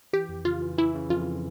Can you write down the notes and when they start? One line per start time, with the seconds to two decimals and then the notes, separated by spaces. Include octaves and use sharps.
0.13 E3 G4
0.29 F2
0.45 C#3 F4
0.62 E3
0.78 E3 E4
0.94 C#3
1.10 F2 F4